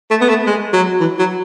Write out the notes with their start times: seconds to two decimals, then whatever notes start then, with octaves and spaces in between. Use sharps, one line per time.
0.10 A3
0.21 B3
0.29 A3
0.47 G#3
0.73 F#3
1.00 E3
1.19 F#3